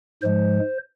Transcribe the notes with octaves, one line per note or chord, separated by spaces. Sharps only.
G#2 F3 G#3 C5